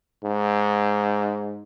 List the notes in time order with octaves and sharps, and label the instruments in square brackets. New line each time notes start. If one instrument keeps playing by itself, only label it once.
[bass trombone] G#2